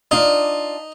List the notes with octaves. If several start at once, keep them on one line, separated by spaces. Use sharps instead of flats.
D4 D#4 F4